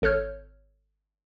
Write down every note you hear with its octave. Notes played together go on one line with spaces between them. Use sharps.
G#1 A4 C#5 F6 G6